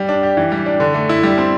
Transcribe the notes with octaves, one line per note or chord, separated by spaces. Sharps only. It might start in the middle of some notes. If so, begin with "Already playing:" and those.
Already playing: G3
D4
G4
E3
G3
D4
D3
A3
E4
G3
C4